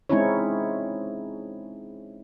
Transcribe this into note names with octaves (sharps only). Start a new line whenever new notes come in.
G#3 C4 C#4 D#4 E4 C#5